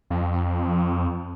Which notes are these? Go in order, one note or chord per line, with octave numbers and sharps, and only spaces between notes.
F2